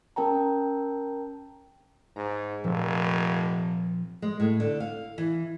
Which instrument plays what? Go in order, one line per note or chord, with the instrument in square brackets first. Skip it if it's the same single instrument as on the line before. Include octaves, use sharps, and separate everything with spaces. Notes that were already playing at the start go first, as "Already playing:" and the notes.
[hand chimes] C#4 A#4 G5 A5 A#5
[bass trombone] G#2 [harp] A#5
[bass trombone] F1 [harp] A#2 F3 C4
[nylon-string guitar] G#3
A2
D3
F5
E3